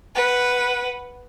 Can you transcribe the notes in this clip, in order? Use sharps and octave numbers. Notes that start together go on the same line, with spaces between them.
B4 F#5